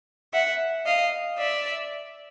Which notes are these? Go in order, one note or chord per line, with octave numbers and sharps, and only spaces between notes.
E5 F#5
D#5 F5
D5 E5